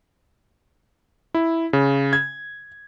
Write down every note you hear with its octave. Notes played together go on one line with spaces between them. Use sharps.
E4
C#3
G#6